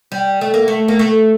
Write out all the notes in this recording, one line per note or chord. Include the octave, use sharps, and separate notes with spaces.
G3
A3
A#3
A3
A#3
A3